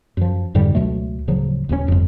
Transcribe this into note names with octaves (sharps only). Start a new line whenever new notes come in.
F#2 F3
F2 G#2 D3 G3
C#2 B2 F#3 A3
D1 C#3 F3 F#3
D#1 C#2 G#2 C#4
G1 F2